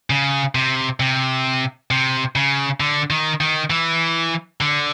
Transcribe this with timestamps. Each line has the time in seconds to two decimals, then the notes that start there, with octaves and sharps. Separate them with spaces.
0.10 C#3
0.55 C3
1.00 C3
1.91 C3
2.36 C#3
2.80 D3
3.10 D#3
3.40 D#3
3.70 E3
4.61 D3